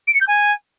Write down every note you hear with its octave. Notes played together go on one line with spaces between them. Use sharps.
D7
C#7
G6
G#5